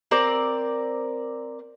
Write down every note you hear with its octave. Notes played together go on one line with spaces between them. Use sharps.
C4 A#4 D5